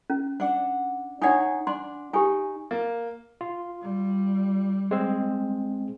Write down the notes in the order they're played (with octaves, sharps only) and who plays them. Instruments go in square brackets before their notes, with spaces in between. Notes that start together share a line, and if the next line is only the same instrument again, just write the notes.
[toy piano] C#4
[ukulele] D4 F#5
[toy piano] D4 F#5 G#5 [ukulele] D#4 C#5
[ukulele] D4 [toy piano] C6
[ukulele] D#4 [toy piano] G4 G#5
[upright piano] A#3
[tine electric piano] F4
[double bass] G3
[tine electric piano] G#3 C4